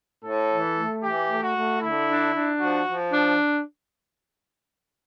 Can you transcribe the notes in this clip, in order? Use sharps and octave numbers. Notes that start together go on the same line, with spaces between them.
A2 A4
E3
A3
E3 G4
A3
F#4
A3
D3 E4
D4
D4
F3 F#4
F3
D4